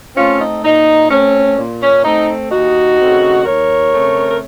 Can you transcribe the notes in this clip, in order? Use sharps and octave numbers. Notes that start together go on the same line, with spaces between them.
A3 C4 C#4 F4
D#4
A#2 D#4
A3 C4 C#4
A#2
C#4
A3 C4 D#4
D#2 D#4 F#4
C#3 A3 C4
D#2 A#4 C#5
C#3 A3 C4
A#4